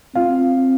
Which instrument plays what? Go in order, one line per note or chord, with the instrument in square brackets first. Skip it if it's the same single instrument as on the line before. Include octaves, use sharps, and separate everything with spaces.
[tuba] C4 [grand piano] F4 F5